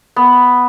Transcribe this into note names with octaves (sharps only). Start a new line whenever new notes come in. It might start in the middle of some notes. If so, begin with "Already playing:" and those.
B3